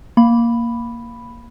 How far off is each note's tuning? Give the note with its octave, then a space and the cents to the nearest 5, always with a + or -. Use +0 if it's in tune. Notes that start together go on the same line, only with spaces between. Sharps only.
A#3 +0 B5 +0